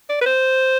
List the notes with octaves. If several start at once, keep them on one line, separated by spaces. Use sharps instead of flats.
D5
B4
C5